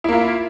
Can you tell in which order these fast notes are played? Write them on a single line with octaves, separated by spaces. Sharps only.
E4 A#3 F4